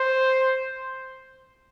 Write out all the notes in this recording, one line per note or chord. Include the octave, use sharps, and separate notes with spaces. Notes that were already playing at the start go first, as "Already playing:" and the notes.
Already playing: C5